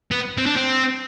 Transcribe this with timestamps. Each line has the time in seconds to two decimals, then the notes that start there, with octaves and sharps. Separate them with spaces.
0.11 B3
0.37 C4
0.46 D4
0.56 C4